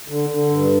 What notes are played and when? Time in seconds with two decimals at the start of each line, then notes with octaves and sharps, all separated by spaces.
0.08 D3
0.30 D3
0.50 G2